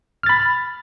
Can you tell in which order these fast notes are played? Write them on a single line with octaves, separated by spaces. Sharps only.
F6 A6 B5